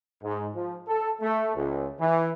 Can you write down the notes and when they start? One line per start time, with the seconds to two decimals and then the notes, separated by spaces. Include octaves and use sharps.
0.23 G#2
0.54 F3
0.88 A4
1.21 A3
1.56 C#2
1.99 E3